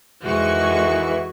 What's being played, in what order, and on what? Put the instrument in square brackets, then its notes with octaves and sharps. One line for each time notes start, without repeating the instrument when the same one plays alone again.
[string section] F2 G#3 C#6 [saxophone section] D#3 E3 [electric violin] F#4